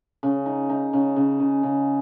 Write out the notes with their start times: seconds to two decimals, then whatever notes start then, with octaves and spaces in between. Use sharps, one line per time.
0.23 C#3
0.46 D#4
0.70 D#4
0.93 C#3
1.16 C#3
1.40 C#3
1.63 C#3